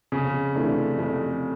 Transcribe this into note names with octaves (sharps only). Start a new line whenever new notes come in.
F2 C#3
C3 E3 A3 D4
F2